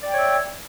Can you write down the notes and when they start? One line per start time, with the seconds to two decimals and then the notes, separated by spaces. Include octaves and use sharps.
0.02 D5
0.07 G5
0.12 C#5
0.17 E5